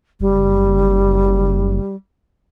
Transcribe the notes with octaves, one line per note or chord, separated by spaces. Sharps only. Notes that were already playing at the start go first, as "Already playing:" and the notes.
F#1 G3